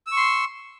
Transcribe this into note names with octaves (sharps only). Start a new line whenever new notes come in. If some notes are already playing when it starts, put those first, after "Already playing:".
C6 C#6 E6